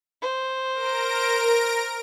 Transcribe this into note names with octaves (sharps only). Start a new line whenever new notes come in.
C5
A#4 A#6 D7